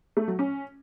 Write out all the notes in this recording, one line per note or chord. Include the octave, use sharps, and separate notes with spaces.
A3
F#3
C#4